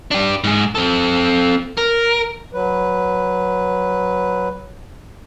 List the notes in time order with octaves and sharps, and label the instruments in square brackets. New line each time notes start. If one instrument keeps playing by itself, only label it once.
[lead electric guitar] D4 G4
G#2 G#4
C4 A4
A#4
[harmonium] F#3 B4